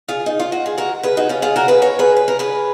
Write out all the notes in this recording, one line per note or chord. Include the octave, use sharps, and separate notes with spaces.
F4 G#4
D#4
F4
F#4
G#4
F#4 A#4
G#4 B4
D#4 F#4
C#4 F4
F4 G#4
F#4 A#4
G#4 B4
A#4 C#5
G#4 B4
B4
A#4
G#4 B4